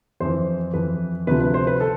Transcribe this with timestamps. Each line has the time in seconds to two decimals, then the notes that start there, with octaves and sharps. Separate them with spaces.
0.20 F2 E3 C5
0.74 F2 E3 B4
1.27 D2 C3 F3 B4
1.40 B4
1.54 C5
1.67 B4
1.80 A4